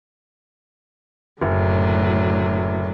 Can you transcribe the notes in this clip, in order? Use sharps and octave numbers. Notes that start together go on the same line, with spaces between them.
F#1 A2 D3 F#3